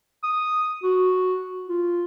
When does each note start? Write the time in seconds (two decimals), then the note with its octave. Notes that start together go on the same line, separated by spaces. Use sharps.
0.23 D#6
0.83 F#4
1.68 F4